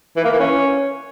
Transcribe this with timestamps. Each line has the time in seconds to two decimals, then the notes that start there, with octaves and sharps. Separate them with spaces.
0.16 E3
0.24 A#3
0.32 E3
0.40 C#4